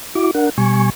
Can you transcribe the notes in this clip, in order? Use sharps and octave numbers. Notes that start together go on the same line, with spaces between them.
E4 F#4 D6
D4 A#4 F#5
B2 G3 G#5 C#6